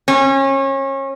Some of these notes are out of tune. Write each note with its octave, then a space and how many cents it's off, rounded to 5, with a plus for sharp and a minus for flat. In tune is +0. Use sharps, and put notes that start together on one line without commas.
C#4 -30